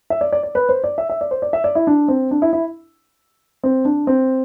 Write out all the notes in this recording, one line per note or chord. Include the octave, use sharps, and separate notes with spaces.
E5
D5
D5
D5
B4
C5
D5
E5
E5
D5
C5
D5
E5
D5
E4
D4
C4
D4
E4
E4
C4
D4
C4